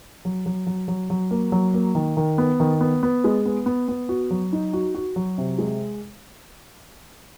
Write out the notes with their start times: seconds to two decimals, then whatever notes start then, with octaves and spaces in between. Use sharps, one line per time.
0.25 F#3
0.46 F#3
0.67 F#3
0.88 F#3
1.10 F#3
1.31 A#3
1.52 F#3
1.74 A#3
1.95 D#3
2.17 D#3
2.38 B3
2.60 D#3
2.81 B3
3.03 B3
3.24 G#3
3.45 B3
3.66 B3
3.88 B3
4.09 F#4
4.30 F#3
4.53 D#4
4.73 F#4
4.95 F#4
5.16 F#3
5.38 C3
5.58 G#3